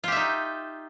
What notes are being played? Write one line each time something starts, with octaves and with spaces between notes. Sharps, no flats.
D#4 F4 G4 E5